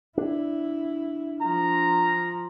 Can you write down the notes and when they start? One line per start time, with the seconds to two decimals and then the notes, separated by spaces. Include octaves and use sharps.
0.18 D4 E4
1.42 F3 A#5